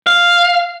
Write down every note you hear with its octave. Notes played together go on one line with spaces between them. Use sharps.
F5